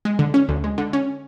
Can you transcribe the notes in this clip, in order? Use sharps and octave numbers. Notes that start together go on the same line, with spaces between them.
G#3
D3
C#4
D2
G#3
D3
C#4